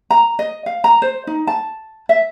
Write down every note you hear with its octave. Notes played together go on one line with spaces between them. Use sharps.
A#5
D#5
F5
A#5
C5
D#4
A5
E5